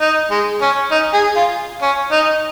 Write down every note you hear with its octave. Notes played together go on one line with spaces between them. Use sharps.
D#4
G#3
C#4
D#4
G#4
F4
C#4
D#4